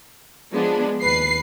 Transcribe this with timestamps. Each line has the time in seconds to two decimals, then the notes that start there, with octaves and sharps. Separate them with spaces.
0.51 F3 G#3 B3 D4
1.02 D#2 B4 C7